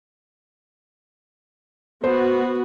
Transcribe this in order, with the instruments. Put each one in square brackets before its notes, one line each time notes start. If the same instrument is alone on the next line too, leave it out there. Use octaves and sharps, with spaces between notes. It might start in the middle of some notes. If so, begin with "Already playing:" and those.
[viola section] B3 F#4 [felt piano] C5